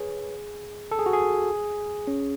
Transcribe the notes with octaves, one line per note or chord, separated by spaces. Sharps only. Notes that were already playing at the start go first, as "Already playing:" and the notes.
Already playing: G#4 B4 C#5
A4
G#4
F#4
G#4
C#4